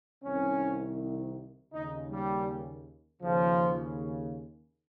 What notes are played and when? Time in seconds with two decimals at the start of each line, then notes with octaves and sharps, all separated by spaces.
0.23 C2 C3 D#3 C#4
1.72 D#2 C#3 D#4
2.10 G3
3.22 D#2 C#3 F3